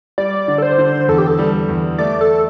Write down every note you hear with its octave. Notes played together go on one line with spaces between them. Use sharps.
G3 D5
D3
A4
C5
D3
E2 A4
G4
A4
G3
E2
A3 D5
A4